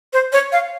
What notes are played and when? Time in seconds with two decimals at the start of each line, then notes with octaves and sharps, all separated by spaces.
0.13 C5
0.33 C#5
0.52 F5